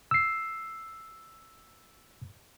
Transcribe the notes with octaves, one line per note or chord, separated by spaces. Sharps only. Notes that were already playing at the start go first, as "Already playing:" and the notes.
E6 C7